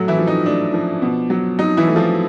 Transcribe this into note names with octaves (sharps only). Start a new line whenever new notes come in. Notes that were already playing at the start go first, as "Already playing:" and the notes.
Already playing: A2 F#3 A3 F#4
E3 E4
F3
D#4
A3 D4
F3
B2
F#3
F#3 D#4
E3 E4
A3
F3 F4